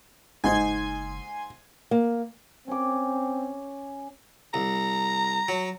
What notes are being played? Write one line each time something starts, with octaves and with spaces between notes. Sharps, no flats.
F#1 G#2 D#4 G#5 C6 G#6
A#3
C4 C#4 D6
C2 A#5
F#3